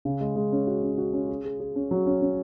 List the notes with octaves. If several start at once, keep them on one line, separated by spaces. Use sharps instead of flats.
C#3
G#3
G#3
C#4
F#4
C#4
F#4
C#4
G#4
G#4
G#4
C#4
F#3
C#4
C#4